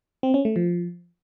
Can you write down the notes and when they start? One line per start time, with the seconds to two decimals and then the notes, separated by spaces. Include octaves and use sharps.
0.23 C4
0.34 C#4
0.45 A3
0.56 F3